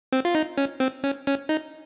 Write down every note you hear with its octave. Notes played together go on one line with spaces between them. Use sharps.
C4
F4
D#4
C#4
C4
C#4
C#4
D#4